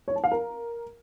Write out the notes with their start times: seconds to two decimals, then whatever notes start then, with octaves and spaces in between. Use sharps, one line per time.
0.08 C#5
0.16 A5
0.24 F5
0.32 A#4